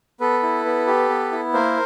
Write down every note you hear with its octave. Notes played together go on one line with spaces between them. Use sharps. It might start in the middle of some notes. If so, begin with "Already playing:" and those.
B3 A4 B4
E4
B3
G4
B3
E4
A#3 A#4 C5